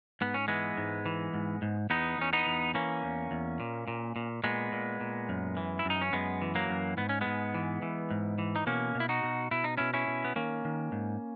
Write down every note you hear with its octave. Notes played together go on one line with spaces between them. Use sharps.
G#2 B3
C#4
E3 G#3 B3
G#2
E3
G#2
G#2
E2 B3 D#4
E2 C#4
B3 D#4
E2
E3 A#3 C#4
E2
E2
A#2
A#2
A#2
A#2 G#3 B3
A#2
A#2
F#2
E3
E4
F#2 D#4
C#4
F#2 G#3 B3
E3
F#3 A#3
F#2
G#2 B3
C#4
G#2 G#3 B3
E3
E3
G#2
E3
D#4
B2 A#3 C#4
B2
E4
D#4 F#4
B2
B2 E4
D#4
B2 C#4 E4
C#4 E4
B2
B3
D#3 A#3 C#4
D#3
G#2